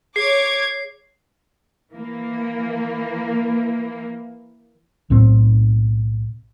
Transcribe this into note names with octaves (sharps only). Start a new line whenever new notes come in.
G#4 C#5 D6 G#6 C7
E3 A#3
B1 A2 C4